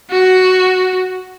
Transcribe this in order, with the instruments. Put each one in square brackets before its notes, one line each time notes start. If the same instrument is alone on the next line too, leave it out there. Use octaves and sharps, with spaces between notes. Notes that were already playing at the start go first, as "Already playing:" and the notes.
[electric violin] F#4